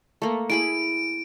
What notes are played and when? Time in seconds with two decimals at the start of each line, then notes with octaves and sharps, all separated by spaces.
0.22 A3 A#3
0.50 E4 G#4 B5 D7